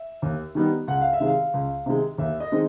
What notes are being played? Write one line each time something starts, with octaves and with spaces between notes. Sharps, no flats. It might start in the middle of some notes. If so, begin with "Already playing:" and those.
Already playing: E5
D#2
D#3 G3 B3 D#4
C#2 F#5
F5
E5
C3 D#3 G#3
F5
C#2
C3 D#3 G#3
D#2 E5
D#5
D#3 G#3 C4 D#4